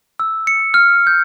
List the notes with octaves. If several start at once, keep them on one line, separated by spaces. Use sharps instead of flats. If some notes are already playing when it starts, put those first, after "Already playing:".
E6
C#7
F6
G6